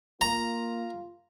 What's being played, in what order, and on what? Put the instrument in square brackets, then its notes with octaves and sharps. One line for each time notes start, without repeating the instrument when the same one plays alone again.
[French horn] A#3 [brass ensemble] F4 [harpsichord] A#5